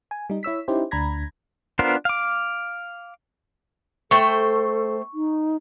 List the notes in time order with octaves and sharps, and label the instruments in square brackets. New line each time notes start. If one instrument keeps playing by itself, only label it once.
[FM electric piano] G#5
G3 D#4
E4 C#5 E6 B6
C#4 D#4 E4 G4 C5
D2 D4 A#5 B5 G#6 A#6
[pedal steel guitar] B3 D4 F4 A#4 C5
F5 D6
[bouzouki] A3 C5 G5 [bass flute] A4 [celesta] C#6
[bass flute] D#4